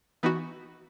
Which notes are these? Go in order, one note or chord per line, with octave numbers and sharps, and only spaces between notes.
E3 B3 D#4 F#4